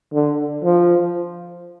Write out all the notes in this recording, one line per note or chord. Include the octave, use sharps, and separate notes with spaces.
D3
F3